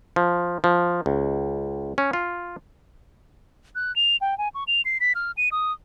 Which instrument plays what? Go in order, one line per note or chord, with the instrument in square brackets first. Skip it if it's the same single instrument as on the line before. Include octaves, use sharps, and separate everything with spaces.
[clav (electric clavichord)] F3
F3
C#2
C#4
F4
[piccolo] F#6
F7
G5
G#5
C#6
F7
C7
B6
F6
D#7
D#6